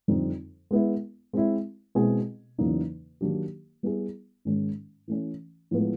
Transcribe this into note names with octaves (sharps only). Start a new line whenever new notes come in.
F2 D3 G3 C4 D#4
G#3 B3 E4
G#3 C4 E4
B2 G#3 C4 E4 G#4
E2 C#3 F#3 A#3 D#4
D#3 F#3 A#3 D4 G4
G3 B3 E4 G#4
G#2 D#3 G#3 C#4
E3 A3 C#4
A2 F3 G#3 B3